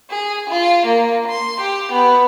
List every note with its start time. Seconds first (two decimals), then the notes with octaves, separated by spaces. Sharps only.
0.10 G#4
0.49 F4
0.85 A#3
1.27 C6
1.60 G4
1.91 B3